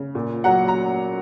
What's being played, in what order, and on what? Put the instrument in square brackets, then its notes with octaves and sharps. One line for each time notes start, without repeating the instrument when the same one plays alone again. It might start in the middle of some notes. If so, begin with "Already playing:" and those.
Already playing: [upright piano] C#3
A#2
F#3 F#5 A#5
A#5